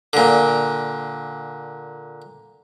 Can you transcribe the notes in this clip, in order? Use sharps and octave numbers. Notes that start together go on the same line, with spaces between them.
A#2 D3